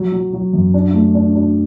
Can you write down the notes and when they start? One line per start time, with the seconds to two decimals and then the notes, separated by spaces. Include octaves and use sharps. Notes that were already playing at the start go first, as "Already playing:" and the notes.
Already playing: F#3
0.12 F#3
0.33 F#3
0.53 F#2
0.74 D4
0.94 A3
1.15 D4
1.35 D4